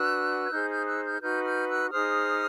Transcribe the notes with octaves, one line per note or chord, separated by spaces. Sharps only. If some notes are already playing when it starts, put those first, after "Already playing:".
Already playing: D4 F#4 B4 E6 F#6
G#6
D#4 G#4 C5 F6 G6
F6 G6
E6 F#6
F6 G6
D#4 F#4 B4 F6 G6
F6 G6
E6 F#6
D#4 G#4 C5 D#6 F6